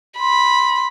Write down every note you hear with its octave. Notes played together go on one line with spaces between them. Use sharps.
B5 C6